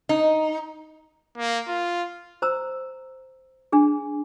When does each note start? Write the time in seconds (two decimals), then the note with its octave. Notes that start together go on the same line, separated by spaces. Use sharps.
0.09 D#4
1.38 A#3
1.68 F4
2.42 C5 A#5 E6
3.72 D4 G#4